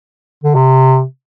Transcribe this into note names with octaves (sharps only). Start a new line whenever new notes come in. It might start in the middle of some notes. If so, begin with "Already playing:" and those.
D3
C3